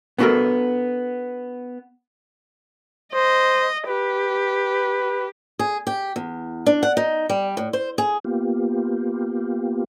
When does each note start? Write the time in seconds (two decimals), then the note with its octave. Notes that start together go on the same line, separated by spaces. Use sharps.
0.19 B3 D4 F#4 G4 A4 A#4
3.14 C5 D#5
3.88 G4 B4
5.59 G#4
5.87 G4
6.16 E2
6.66 D4
6.83 F#5
6.97 D#4
7.29 G3
7.57 A2
7.73 C5
7.98 G#4
8.25 A#3 B3 F4 G4